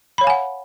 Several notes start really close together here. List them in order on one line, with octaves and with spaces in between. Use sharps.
B5 C#5 F5 G#5 F#5